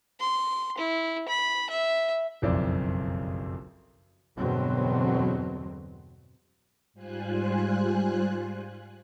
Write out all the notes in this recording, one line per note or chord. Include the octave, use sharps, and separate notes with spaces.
C6
E4
B5
E5
F#1 B1 F2 E4 D5
E2 G2 B2 D3 F#3 C4
G#2 G3 F4 C5 G#5 F#6